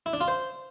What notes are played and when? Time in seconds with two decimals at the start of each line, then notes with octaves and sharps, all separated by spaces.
0.06 E4
0.13 D4
0.21 F4
0.28 C5